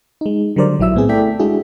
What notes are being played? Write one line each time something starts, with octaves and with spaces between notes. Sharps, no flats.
G#3 D#4
D3 F#3 G3 A#4 C5 D5
A#1 F#3 E4 E5 E6
A2 B3 C4 G#4
A3 E4 A4 D5 G5 B6
G#3 D4 E4 F#4 G#4